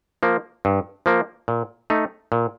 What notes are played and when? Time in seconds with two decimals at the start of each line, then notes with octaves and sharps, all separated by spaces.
0.23 F3 A#3
0.65 G2
1.06 F3 A#3
1.48 A#2
1.90 A3 D#4
2.32 A#2